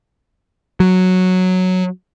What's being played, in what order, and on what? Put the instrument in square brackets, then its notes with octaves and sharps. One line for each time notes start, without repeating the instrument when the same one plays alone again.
[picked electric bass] F#3